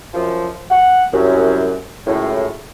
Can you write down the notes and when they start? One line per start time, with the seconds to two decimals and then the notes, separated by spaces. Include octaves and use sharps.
0.14 F#2 F3
0.71 F#5
1.13 C2 F#2
2.07 C#2 F#2 A2